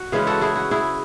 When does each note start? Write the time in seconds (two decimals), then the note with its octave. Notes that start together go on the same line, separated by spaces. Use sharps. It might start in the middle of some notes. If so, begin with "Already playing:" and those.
Already playing: F#4
0.12 C#3 E3 G#3 C#4 G#4 B4
0.27 F#4 A4
0.41 E4 G#4
0.56 F#4
0.71 E4 G#4